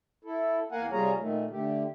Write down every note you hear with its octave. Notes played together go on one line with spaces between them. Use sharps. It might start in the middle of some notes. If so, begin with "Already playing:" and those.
E4 A4
E2 A#3 A#4 F5 F#5 G#5
C3 G3 F4 G#4 C#5 A#5
A#2 D#3 A3
D3 A3 G4